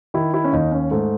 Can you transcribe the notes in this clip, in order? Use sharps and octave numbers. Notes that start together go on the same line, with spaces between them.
D#3 E4
E4
C#4
D#2 D#4
C#4
G#2 A3